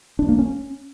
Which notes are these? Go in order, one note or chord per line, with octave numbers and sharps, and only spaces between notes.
D4
A#3
C#4